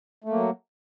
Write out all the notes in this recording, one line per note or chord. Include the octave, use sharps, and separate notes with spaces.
F#3 A3 A#3